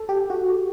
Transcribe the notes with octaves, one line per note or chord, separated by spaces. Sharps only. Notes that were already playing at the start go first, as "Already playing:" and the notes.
Already playing: A4
G4
F#4